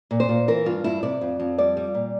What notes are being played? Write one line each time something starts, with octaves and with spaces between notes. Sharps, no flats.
A#2
C5
A#2
E3 A#4
G2 F4
G2 E4
C3 D5
F2
F2
G3 D5
G3
A#2